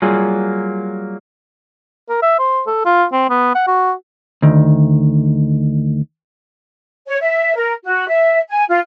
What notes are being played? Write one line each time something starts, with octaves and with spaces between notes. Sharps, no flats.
F#3 G3 A#3 F4 G#4
A#4
E5
C5
A4
F4
C4
B3
F#5
F#4
D2 D#3
C#5
E5
A#4
F#4
E5
G#5
F4